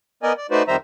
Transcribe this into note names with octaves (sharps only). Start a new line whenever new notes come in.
B3 A#4 D5 D#5 G#5
D5
A3 D#4 F#4 B4 C5 D5
F2 D#3 G3 C5 E5 A#5